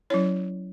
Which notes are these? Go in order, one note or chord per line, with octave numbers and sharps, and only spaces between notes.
F#3 C#4 E4 C#5